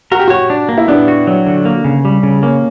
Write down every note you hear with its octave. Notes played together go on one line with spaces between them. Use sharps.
F#4 A#4
G4
F#4 C#5
D4
A#3
E4
B3 D4
F#4
F#3
D3
A#3
C#3
G3
C#3
A#3 C#4